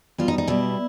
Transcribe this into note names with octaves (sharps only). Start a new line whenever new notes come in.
B2 G3 F4
D#4
D#4
B2 G3 E4